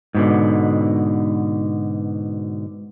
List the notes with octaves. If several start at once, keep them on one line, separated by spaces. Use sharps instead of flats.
G#2 B2 D3